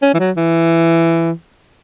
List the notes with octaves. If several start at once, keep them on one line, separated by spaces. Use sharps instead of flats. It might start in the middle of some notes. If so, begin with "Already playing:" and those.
C#4
E3
F#3
E3